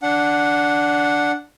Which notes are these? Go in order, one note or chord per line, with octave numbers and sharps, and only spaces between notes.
D4 F#5